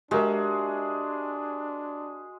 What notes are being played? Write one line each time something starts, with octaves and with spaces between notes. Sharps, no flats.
G#3 D4 F#4 G4 A#4 E5